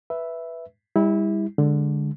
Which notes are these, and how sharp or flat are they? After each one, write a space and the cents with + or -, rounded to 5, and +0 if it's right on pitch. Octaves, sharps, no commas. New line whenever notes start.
B4 +0 E5 +0
G3 +30 E4 -20
D3 +0 G#3 +0